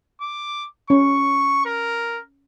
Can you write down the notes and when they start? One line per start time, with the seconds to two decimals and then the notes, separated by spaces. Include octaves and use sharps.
0.21 D6
0.90 C#4 C#6
1.65 A#4